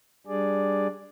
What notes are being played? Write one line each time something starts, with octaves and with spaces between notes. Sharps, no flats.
G3 D4 G#4 D5